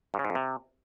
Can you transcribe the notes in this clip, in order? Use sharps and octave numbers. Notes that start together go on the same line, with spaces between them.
G2
C#3
G#2
F2
C3